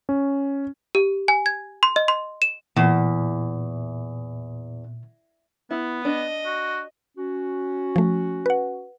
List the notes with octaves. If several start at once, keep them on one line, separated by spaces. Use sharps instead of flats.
C#4
G4
G#5
G#6
C6
D#5
C6
E7
E2 A#2
B3 E4
D4 D#5
F#4
C#4 F#4
F3 A3
B4 F#5